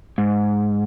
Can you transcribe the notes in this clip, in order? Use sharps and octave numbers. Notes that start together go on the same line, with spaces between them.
G#2